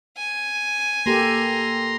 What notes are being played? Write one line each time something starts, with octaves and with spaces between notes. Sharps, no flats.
G#5
A#3 G4 A4 A#5 C6